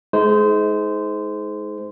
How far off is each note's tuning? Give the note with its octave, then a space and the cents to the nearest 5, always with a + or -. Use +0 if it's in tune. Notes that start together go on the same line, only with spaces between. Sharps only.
G#3 +30 D#4 +30 C5 -20